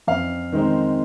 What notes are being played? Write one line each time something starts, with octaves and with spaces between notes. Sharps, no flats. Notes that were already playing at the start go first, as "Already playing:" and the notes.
F2 F5
D#3 G#3 C4 D#4